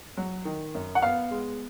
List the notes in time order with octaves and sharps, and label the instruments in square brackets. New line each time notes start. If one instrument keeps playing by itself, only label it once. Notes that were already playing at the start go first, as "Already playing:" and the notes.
[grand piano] F#3
D#3
F#2
[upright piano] F#5
[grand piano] B3 [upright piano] F5
[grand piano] G#3